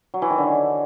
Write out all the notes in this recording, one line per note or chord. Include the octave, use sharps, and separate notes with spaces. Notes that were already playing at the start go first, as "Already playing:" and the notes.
F#3
E3
D#3
D3